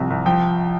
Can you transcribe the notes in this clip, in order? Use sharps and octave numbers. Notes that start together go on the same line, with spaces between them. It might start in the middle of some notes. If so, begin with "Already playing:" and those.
Already playing: C2 C3 F3
C2
F3 G5